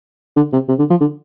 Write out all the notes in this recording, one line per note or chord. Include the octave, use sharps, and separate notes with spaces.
D3
C3
C3
D3
F3
D3